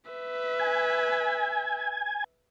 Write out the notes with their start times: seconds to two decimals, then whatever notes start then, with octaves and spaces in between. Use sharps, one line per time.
0.11 B4 E5
0.59 G#5